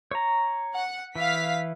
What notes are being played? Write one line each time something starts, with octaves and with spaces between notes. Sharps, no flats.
C#5 A#5
F#5
E3 F5 B6